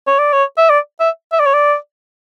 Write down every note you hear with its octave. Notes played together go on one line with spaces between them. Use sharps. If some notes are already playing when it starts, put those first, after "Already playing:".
C#5
D5
C#5
E5
D5
E5
E5
D5
C#5
D5